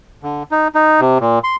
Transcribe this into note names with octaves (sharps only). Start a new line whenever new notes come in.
D3
D#4
D#4
C3
A#2
C6